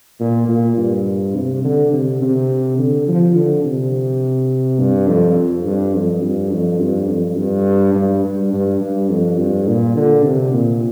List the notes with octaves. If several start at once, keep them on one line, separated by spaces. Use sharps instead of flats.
A#2
A#2
G2
C3
D3
C3
C3
D3
F3
D3
C3
G2
F2
G2
F2
G2
F2
G2
F2
G2
G2
G2
G2
G2
F2
G2
A#2
D3
C3
A#2